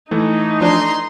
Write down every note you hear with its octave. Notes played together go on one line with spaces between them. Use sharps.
E3 A3 D#4
F3 D4 A#5 C6